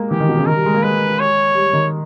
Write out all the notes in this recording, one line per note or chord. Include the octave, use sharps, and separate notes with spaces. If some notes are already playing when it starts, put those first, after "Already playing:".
Already playing: G#3 A#3
E3 G4
D#3
B2
C#3
D#3 A#4
G3
G#3
A#3
G#3 B4
C#5
G3
D#3